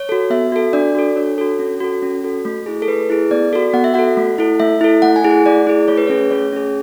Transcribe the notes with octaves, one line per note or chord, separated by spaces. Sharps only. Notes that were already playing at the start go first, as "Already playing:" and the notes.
Already playing: C#5
F#4 A4
B3 E5
F#4 A4
D4 D5
F#4 A4
D4 C#5
F#4 A4
C#4
F#4 A4
C#4
F#4 A4
A3
E4 G#4
A4
A3 B4
E4 G#4
B3 D5
F#4 A4
B3 F#5
E5
F#4 A4 F#5
A3
E4 A4
A3 E5
E4 A4
A3 F#5
G#5
E4 G#4
F#5
A3 D5
E4 G#4
A3 C#5
B4
C#4 G#4 C#5
A3 C#5
C#4 G#4